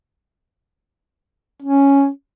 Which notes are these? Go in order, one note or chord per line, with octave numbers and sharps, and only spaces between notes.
C#4